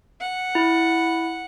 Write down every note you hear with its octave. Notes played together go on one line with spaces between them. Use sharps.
F#5
E4